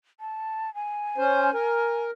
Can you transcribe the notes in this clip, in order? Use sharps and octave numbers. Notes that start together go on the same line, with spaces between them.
A5
G#5
C#4 C5
A#4